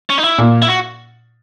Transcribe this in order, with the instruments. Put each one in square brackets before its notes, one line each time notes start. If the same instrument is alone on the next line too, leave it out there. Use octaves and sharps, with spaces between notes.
[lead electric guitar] C#4
D#4
E4
[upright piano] A#2
[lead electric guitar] E4
F#4